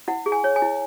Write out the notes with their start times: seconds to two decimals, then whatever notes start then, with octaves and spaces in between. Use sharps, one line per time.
0.08 E4 F#5
0.26 G#4
0.32 G#5
0.44 C#5
0.56 G#5
0.62 E4